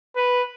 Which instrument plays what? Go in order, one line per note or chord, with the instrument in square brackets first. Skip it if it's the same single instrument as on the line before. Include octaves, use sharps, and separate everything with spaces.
[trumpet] B4